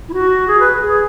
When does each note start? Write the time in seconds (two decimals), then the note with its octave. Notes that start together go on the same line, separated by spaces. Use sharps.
0.09 E4
0.14 F#4
0.48 G#4
0.60 B4
0.82 G#4